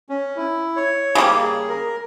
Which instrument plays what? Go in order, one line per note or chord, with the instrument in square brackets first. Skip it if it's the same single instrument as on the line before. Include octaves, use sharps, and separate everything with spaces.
[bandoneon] C#4
E4
C#5
[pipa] C#3 G3 A#3
[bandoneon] G#4
A#4